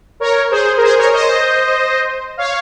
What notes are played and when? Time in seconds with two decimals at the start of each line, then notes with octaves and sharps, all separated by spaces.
0.20 A#4 C#5
0.51 G#4 C5
0.77 A#4
0.82 G#4 C5
0.98 A#4 C#5
1.08 C#5
1.13 C5 D#5
2.37 C#5 F5